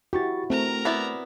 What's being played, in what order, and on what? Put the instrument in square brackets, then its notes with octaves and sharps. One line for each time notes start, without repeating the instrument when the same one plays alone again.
[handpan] E4 F#4 [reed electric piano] G4 C#6 A6
[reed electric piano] A3 [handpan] C4 [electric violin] A#4 A#5
[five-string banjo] B3 E4 D5